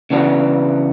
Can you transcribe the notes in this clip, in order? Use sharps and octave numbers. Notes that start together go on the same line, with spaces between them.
C#3 E3 B3 D4 F#4